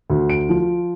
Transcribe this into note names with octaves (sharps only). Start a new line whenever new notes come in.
D2
D7
F3